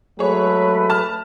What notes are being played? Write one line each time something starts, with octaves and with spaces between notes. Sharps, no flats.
F#3 G#3 A3 G#4 B4 C#5
A5 F6